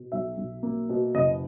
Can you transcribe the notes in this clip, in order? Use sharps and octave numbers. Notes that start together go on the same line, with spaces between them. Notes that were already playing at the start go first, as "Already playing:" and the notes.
Already playing: B2
B1 E5
B1
A#3
B2
F#1 D#5